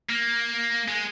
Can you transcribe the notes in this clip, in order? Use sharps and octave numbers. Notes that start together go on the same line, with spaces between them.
A#3
G#3